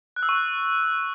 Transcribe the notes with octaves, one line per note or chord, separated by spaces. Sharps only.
F#6
E6
C#6
F#6